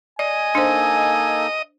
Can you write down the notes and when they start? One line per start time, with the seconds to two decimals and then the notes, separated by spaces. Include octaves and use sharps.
0.19 D5 D#5 G#5
0.55 A#3 D4 D#4 A4 C5